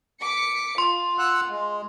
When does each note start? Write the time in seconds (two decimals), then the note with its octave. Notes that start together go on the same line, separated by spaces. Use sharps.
0.21 D6 B6 C#7
0.78 F4 C6
1.19 F#5 E6 F#6
1.49 G#3